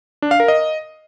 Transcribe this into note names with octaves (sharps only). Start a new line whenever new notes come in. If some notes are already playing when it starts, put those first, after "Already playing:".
D4
F5
A#4
D#5